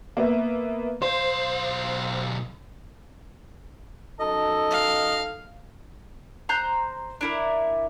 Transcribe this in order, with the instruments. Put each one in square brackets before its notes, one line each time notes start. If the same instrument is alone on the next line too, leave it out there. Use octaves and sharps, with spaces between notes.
[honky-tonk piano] A#3 B3 E5
[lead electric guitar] B1 F5 [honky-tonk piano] C5
[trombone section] F#2 D#4 A4 [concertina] D#5
[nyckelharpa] F5
[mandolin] C5 A#5 F#6 G6
D4 E4 A#4